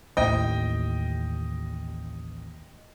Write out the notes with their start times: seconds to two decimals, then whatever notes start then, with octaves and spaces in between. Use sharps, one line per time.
0.17 A1 D#2 D#5 G5